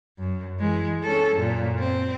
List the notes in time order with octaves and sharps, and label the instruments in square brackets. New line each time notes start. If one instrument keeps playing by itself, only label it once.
[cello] F#2
E3 G#3
C#4 A4
F#2 A#2
C4